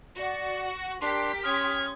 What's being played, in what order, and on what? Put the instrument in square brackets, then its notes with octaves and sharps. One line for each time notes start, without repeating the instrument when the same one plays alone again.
[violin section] F#4 [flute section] D5
[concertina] D4 C6 [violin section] G4 B6 [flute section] A#4
[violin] C#4 G#6 [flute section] C6 D#6 [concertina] F6